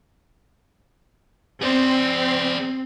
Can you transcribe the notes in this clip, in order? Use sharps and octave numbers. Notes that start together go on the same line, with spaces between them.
C4 G#4 D5